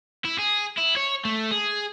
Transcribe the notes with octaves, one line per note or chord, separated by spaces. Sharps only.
E4
G#4
E4
C#5
A3
G#4